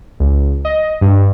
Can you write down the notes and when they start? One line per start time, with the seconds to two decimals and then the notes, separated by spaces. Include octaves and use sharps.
0.20 C#2
0.65 D#5
1.01 G2